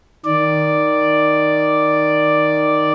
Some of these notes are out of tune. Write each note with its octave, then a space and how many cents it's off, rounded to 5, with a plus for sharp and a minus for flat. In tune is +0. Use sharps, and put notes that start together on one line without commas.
D#3 +0 D5 +0